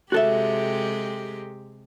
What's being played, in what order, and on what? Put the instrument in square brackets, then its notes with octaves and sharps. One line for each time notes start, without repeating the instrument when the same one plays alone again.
[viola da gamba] C3 G#3 G4 [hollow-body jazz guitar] F#4 A4 E5